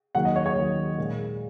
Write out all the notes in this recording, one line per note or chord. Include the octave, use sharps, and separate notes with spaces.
D#2 D#3 F#3 A#3 F#5
D#5
C#5
C#5
D#2 D#3 F#3 A#3
A#2 G#3